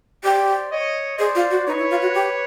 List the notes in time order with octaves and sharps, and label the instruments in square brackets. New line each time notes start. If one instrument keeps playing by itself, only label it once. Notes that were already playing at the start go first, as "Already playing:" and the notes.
[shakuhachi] G4 [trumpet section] C5 D5
[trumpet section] C#5 D#5
[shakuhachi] G#4 [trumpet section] C5 D5
[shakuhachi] F4
F#4
[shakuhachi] D#4 [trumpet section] B4 C#5
[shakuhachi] E4
F4
F#4
G4